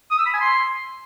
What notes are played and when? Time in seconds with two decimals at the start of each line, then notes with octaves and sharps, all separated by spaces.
0.11 D#6
0.18 E6
0.26 B5
0.34 G#5
0.41 C6